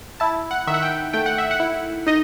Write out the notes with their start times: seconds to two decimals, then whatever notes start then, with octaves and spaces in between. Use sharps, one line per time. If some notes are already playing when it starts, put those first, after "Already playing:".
0.20 E4 A5
0.51 F#5
0.67 D#3 E5
0.74 F#5
0.82 G5
1.13 A3 G5
1.26 F#5
1.38 E5
1.51 F#5
1.60 E4
2.07 D#4 D#5